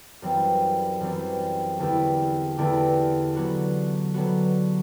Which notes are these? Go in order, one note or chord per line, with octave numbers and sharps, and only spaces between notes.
F#2 E3 G3 C4
F#2 E3 G3 C4
E2 D3 A3 E4 G4
E2 D3 A3 E4 G4
D3 F#3 B3 F#4
D3 F#3 B3 F#4